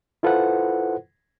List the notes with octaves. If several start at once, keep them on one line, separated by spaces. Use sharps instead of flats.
E4 F4 A4 B4 C5 F#5